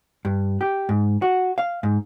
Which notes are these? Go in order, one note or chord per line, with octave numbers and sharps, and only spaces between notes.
G2
G4
G#2
F#4
F5
G#2